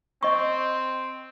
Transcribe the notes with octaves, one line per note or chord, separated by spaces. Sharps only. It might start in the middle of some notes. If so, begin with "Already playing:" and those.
C4 D#5 C#6